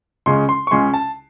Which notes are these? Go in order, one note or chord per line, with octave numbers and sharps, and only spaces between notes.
C#2 C#3 G#3 C#4 C6
C6
C#6
C#2 C#3 G#3 C#4 C6
A5